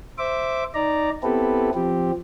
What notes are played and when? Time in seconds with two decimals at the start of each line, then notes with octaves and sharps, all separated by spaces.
0.18 C5 E5 D6
0.74 D#4 D5 A#5
1.23 B3 C4 E4 G4 A4 B4
1.74 F3 C4 G4